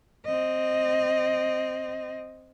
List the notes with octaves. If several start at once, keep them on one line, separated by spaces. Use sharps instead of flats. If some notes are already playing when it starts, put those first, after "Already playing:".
C4 D#5